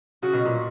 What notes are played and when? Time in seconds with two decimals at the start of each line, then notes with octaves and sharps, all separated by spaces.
0.23 C#3 F#4
0.33 B2
0.45 A#2